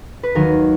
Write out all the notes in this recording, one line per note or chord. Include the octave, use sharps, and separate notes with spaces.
B4
D#2 D#3 F#3 A#4